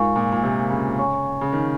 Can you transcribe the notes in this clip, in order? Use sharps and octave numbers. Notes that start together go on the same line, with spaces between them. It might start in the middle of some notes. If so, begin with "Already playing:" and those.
Already playing: G#2 F4 A#4 F5 G#5 C#6
A#2
A#2
C3
C#3
C#5 G#5 C#6
C#3
D#3